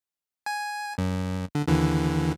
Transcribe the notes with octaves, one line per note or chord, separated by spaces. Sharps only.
G#5
F#2
D3
D#2 D3 E3